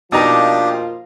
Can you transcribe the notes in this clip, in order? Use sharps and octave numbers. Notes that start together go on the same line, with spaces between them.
B2 F3 A#3 D4 D#4 F4 G4 A#5